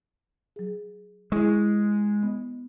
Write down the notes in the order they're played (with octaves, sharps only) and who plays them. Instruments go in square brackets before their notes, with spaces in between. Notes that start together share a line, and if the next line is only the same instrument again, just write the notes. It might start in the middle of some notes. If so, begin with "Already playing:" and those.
[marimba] F#3 G#4
[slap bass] G#3 [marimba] E4 G#4 C#6
[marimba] B3